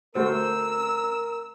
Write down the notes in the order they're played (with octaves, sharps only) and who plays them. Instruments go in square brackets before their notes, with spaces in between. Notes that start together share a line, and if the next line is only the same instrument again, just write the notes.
[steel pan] A3 F#4 C5 [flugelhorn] A#4 [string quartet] E6